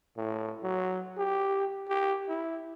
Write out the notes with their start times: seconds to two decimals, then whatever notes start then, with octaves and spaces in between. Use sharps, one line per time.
0.17 A2
0.63 F#3
1.18 G4
1.88 G4
2.29 E4